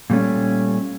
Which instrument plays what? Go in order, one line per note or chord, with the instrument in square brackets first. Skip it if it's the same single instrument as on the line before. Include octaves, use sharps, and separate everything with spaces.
[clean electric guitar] A#2 G3 A3 C#4